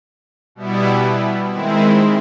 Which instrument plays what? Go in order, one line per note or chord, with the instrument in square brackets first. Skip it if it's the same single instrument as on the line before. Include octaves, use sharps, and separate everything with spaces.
[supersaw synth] B2 G3 B3 E4
D#3 G#3 C4 E4